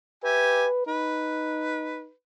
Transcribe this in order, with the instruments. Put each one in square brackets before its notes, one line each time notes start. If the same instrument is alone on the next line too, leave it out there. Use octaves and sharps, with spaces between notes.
[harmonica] G4 E5 G#5 [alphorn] B4
[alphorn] D#4 [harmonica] B4